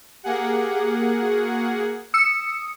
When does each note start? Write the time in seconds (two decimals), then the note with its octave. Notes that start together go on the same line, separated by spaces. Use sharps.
0.24 A#3 G4 G#4 F#5
1.20 F#4
2.14 D#6 E6 C#7